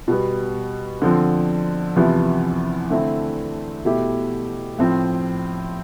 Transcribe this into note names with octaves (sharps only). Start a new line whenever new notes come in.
B2 G3 B3
D3 F3 C4
E2 C3 F3 B3 E4
D3 A3 C4 E4
B2 A3 E4 G4
A2 F3 C4